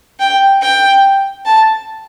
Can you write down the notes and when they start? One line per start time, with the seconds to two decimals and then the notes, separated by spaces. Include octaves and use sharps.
0.20 G5
0.62 G5
1.46 A5